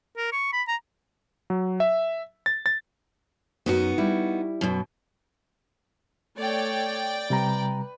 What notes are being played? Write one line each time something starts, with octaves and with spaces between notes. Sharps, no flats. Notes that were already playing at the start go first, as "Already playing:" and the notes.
A#4
C#6
B5
A#5
F#3
E5
A6
A6
F#2 B3 D#4 F#4
G3 E4
F#2 B2
A3 C#5 D5 G5
C3 G3 B4 A#5